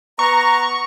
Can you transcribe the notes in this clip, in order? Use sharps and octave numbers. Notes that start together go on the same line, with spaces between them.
B3 B4 A#5 C#6